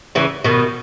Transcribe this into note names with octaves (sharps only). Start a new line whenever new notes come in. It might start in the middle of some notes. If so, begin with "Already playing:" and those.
C#3 E3
B2 D#3